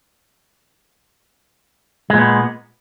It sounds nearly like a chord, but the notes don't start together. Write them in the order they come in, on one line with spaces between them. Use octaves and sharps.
G#3 A#2 B3